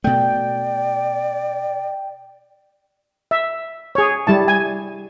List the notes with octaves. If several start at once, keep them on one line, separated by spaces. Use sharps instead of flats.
B2 A3 D5 G5
E5
G#4 C#5
G3 E4 A5
G#5